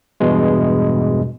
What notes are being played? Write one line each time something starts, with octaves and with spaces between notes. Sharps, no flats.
E2 G2 B2 G#3